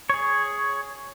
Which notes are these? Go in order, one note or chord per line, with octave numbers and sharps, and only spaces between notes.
G#4 C#5